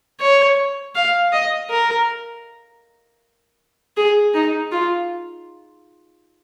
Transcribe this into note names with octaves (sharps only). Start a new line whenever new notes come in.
C#5
F5
D#5
A#4
G#4
D#4
F4